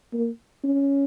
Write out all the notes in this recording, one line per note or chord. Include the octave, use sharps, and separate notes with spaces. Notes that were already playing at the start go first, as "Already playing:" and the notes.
A#3
C#4